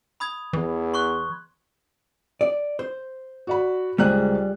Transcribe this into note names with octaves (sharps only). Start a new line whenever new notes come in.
B5 D#6 G#6
E2 E3
C6 C#6 F#6
D5
C5
F#4 D5 B5
C#2 G3 G#4 C5 F#6